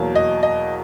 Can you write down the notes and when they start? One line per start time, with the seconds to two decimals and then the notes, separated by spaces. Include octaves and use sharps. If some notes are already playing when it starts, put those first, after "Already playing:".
Already playing: E2 B2 F#3 A#3
0.15 D#5
0.43 D#5